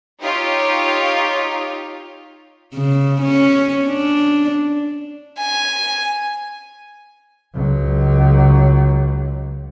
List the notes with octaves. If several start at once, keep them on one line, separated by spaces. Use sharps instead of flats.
D#4 F4 G4 C#5
C#3
C#4
D4
G#5
C#2 F#3